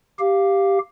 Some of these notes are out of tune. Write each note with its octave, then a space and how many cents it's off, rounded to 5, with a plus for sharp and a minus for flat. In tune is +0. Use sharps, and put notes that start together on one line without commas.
G4 +0 F5 +0